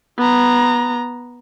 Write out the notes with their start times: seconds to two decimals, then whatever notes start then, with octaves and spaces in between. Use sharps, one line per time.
0.18 B3 A#5